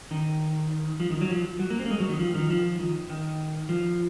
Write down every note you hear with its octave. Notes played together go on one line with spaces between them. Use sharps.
D#3
F3
D#3
F#3
F3
F#3
A#3
C4
A#3
G#3
F#3
D#3
F3
D#3
F3
D#3
D#3
F3